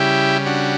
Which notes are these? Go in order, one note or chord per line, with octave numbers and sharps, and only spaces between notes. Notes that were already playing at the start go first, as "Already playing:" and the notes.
Already playing: C#3 G3 E4 G4
D4 F#4